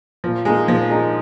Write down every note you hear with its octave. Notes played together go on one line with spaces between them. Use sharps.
A#2 F3
G#3 A#3 D#4 G#4
A#2 F3
A#3 D#4 G#4